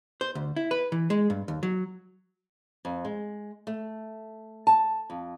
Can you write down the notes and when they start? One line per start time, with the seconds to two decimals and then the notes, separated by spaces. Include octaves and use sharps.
0.21 C5
0.35 D2
0.56 E4
0.71 B4
0.92 E3
1.10 G#3
1.30 G2
1.48 D#2
1.63 F#3
2.85 F2
3.05 G#3
3.67 A3
4.67 A5
5.10 F2